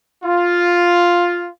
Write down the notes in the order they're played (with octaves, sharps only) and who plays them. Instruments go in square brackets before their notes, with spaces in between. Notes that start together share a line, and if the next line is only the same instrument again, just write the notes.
[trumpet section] F4